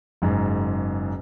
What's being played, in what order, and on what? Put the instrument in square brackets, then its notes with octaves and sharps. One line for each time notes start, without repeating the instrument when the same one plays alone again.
[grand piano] F#1 G#2